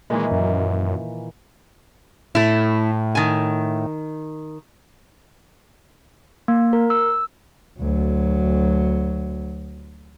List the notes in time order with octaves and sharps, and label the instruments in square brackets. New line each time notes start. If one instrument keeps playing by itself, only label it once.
[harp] A#2 D#3 E3 [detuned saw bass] G#3
[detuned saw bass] F#2
[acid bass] A2 [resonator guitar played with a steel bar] A3 E4
[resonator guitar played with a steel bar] D#3 G#5
[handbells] A#3
A#4
E6
[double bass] D2 F#3